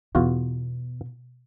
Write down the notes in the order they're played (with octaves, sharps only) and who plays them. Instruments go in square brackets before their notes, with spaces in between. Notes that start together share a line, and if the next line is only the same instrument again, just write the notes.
[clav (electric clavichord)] E2 F4 F#4 [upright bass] B2